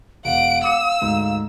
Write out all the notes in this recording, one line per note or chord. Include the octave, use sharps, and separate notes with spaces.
E1 F5 F#5 D7
D6 E6 C#7
D2 G#2